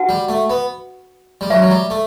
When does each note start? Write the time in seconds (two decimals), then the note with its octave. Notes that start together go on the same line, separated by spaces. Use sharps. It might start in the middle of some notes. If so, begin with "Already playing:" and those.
Already playing: D4 F#4 B4 F#5 A5
0.09 G3
0.29 A3
0.50 B3
1.41 G3
1.50 F#3 B4 E5 A5 C#6
1.62 F#3
1.70 G3
1.90 A3